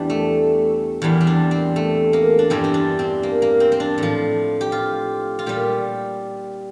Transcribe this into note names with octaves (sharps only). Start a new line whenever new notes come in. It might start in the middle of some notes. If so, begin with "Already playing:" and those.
Already playing: E2 E3 G3 D4
A3
E2 E3 G3
C4
D4
C4
A3
A#3
D4
G2 E3 G3 C4
C4
D4
C4
A#3
A#3
C4
C4
D4
A2 F3
G4
F4
F4
A#2 G3 G4